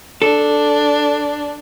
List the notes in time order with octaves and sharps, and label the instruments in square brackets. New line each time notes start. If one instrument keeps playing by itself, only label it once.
[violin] D4 [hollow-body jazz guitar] A4